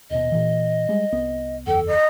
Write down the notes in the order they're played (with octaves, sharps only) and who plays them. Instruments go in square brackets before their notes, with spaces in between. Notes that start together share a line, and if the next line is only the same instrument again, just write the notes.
[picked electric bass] D#1 B2 [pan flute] D#5
[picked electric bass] A#2 E3
G3 G#3
C2 B3
[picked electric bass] F#1 E2 [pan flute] A4 [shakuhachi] G5
[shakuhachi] D#5